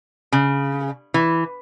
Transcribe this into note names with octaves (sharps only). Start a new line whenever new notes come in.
C#3
E3